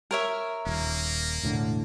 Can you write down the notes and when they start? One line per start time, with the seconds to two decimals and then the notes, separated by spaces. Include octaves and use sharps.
0.11 A#4 C#5 E5
0.66 D#1 A#3
1.43 E1 A2 D3